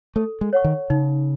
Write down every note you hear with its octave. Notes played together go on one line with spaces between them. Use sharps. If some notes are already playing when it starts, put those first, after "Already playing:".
A3 A4
G#3
C#5 F#5 C#6
D#3
C#3 D#4